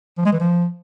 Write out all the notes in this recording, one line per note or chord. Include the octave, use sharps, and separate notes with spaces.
F3
G#3
E3
F3